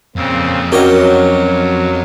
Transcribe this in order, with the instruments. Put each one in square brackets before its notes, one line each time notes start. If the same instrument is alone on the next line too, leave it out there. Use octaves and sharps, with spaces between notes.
[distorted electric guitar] F2 [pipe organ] A#2 C#3 C4
[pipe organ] F#3 [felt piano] C#4 F#4 A#4 [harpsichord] G4 C#5 D#5